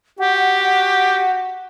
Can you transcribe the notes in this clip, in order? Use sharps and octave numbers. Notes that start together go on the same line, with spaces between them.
F#4 G4 F#5